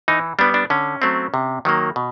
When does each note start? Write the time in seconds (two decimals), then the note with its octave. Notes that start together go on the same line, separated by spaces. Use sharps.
0.08 E3 D#4
0.39 G3 B3 D4
0.54 D4
0.70 D3 C#4
1.02 F#3 A3 C4
1.34 C3
1.65 D#3 F#3 A#3
1.96 B2